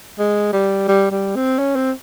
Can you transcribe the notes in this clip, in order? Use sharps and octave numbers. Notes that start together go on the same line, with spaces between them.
G#3
G3
G3
G3
C4
C#4
C4